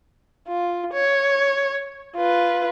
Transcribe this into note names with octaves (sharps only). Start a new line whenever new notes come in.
F4
C#5
F4 B4